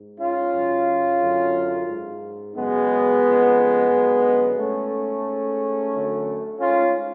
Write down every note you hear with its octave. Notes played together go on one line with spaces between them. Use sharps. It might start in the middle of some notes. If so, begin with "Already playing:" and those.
Already playing: G#2
C#4 F4
F#2 C#3
F#2 D3
G#2
F#2 C#3 G#3 B3
F2 C#3
F#2 D3
G#2 A3 C#4
G#2
F#2 D3
G#2 C#4 F4